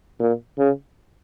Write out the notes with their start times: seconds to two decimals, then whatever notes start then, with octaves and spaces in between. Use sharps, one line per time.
0.20 A#2
0.58 C#3